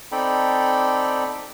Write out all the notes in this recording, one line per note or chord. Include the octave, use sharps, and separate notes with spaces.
C4 D#4 A4 D5 G5 B5